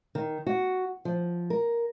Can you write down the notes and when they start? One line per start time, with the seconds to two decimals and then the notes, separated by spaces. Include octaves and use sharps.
0.15 D#3
0.47 F#4
1.05 F3
1.50 A#4